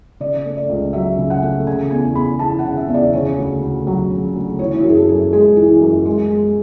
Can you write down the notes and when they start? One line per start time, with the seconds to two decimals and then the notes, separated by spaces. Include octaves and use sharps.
0.20 C#3 D5
0.45 A3
0.57 D5
0.69 C#2
0.93 F#3 E5
1.18 C#3
1.30 F#5
1.43 A3
1.67 C#3 G#5
1.91 E2 G#5
2.15 E2 B5
2.39 E3 A5
2.59 F#5
2.64 C#3
2.77 E5
2.88 E2
2.94 D5
3.13 C#3 C#5
3.38 D2
3.62 D2
3.87 F#3
4.10 C#3
4.36 D2
4.59 E3 C#5
4.75 E4
4.81 F#2 F#4
4.89 G#4
4.97 A4
5.09 F#2
5.33 G#3 G#4
5.57 E3
5.81 F#2
6.06 G#3
6.30 G#3